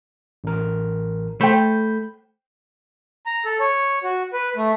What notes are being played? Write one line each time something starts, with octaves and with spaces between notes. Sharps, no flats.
A1 A#4
A3 C5 G5 B5 G6
A#5
A4
C#5
F#4
B4
A3